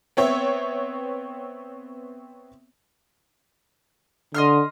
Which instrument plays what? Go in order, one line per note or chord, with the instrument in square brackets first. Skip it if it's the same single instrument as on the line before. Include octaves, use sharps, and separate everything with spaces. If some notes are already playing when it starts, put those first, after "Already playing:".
[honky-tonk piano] B3 C4 C#5 E5
[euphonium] D3 [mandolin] D#5 C6 F6